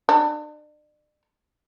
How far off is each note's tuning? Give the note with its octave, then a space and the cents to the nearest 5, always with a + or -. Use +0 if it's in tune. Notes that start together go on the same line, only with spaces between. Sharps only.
D4 +40